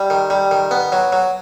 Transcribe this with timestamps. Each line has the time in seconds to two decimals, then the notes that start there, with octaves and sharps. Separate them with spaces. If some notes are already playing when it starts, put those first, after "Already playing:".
Already playing: G3
0.10 D#3
0.30 G3
0.51 D#3
0.71 B3
0.92 F#3
1.12 F#3